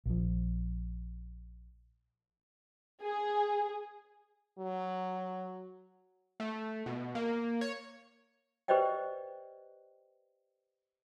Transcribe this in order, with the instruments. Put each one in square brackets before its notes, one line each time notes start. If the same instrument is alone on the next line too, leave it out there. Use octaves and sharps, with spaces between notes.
[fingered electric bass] A#1 F3
[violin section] G#4
[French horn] F#3
[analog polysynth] A3
B2
A#3
C#5
[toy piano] G4 B4 C5 D5 D#5 G5